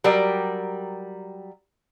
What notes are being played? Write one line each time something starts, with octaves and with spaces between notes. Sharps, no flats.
F#3 G3 G4 A#4 D5